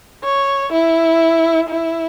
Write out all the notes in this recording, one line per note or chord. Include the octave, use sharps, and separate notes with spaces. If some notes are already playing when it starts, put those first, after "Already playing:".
C#5
E4
E4